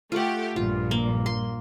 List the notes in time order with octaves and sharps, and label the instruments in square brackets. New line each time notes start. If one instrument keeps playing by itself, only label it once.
[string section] A3 G4 [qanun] F4 F#5
[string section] A#1 G2 A#2 [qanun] F4
[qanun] A#3
C6